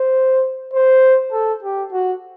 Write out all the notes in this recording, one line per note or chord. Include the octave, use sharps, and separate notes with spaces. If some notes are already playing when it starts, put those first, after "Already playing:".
Already playing: C5
C5
A4
G4
F#4